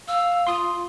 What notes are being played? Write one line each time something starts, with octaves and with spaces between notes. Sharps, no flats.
F5 E6
F4 C6 D#6